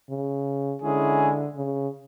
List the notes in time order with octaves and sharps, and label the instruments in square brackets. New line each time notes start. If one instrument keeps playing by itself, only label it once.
[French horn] C#3
[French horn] D3 [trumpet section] G#3 C#4 E4 G#4
[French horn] C#3